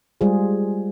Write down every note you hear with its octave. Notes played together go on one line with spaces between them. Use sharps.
G3 G#3 F4 G#4 C5